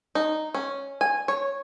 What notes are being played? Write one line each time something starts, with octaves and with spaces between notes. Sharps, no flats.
D#4
C#4
G#5
C#5